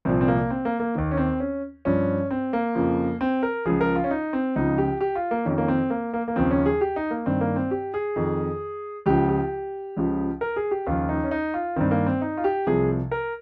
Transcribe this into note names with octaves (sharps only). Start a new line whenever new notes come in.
C2 A#2 F3 C4
C4
A#3
C4
A#3
A#3
D#2 D#3
C#4
C4
C#4
G2 F3 C#4
C4
A#3
F2 C#3 F3
C4
A#4
C#2 C#3 F3 G#4
A#4
F4
C#4
D#4
C4
C#2 C#3 F3 D#4
G4
G4
F4
A#3
F2 D#3 C#4
A#3
C4
A#3
A#3
A#3
D#2 C#3 F3 C4
C#4
G#4
G4
D#4
A#3
G2 D#3 C4
A#3
C4
G4
G#4
F2 D#3
C#2 C#3 F3 G4
G4
C#2 C#3 F3
A#4
G#4
G4
D#2 C#3 F3 F4
D#4
C#4
D#4
F4
G2 D#3 C4
A#3
C4
D#4
F4
G4
C2 C3 F3 G#4
A#4